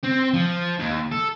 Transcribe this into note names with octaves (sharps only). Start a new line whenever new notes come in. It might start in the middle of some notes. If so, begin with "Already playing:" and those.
C4
F3
D#2
A4